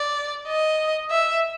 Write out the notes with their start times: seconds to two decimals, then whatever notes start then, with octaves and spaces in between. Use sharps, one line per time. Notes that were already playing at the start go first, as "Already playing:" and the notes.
Already playing: D5
0.48 D#5
1.11 E5